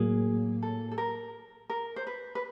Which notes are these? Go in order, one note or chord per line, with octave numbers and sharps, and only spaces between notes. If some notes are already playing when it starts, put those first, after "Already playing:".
Already playing: A2 F#3 A#3 G#4
A4
A4
A#4
A#4
C5
B4
B4